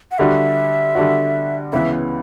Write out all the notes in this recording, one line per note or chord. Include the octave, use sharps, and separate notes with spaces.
F#5
D3 G3 D4 F#4 E5
D3 G3 D4 F#4
C#2 C#3 E3 B3 E4 E5